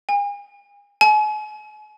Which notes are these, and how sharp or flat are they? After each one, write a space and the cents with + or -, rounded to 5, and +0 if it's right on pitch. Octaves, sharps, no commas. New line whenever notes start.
G#5 -40
G#5 +40